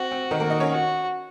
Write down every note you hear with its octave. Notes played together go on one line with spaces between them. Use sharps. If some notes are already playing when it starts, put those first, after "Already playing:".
Already playing: C4 F#4
C4
D#3 D#4
A#3 A#4
D#4 D#5
C#4 C#5
F#4